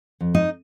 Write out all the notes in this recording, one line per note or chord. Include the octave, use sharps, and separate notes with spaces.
F2
D#4 D#5